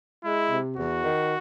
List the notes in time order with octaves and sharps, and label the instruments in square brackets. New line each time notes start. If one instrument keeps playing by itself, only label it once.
[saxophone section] G#3 [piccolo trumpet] E4
[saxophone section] C3
[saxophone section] E2 [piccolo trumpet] F#4
[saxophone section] D#3